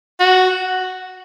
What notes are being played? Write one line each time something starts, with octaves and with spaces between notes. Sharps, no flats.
F#4